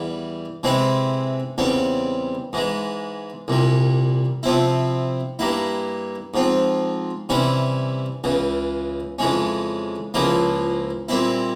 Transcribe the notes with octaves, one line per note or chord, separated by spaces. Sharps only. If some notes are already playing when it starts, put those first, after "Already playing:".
Already playing: E2 E3 G3
C3 E3 G#3 C4 E4
E2 C#3 G3 C4
G#2 E3 G#3
C2 A#2 G3
C3 F3 C4 E4
G2 G3 A#3 E4
G#2 F3 C4
C3 E3 G3 C#4 E4
C#2 C#3 E3
F2 C#3 E3 G#3 C#4
C#2 C#3 F3 A#3 E4
A#2 G3 C4 E4